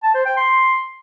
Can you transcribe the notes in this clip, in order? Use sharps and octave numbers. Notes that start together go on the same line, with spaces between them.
A5
C5
G5
C6